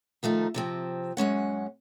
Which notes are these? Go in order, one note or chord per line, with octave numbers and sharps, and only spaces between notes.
D#3 F3 A3 D#4
C3 F3 C4
F#2 G#3 C#4 F#5